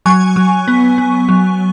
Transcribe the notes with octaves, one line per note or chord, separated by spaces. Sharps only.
F#3 G#5 C#6
F#3
B3
B3
F#3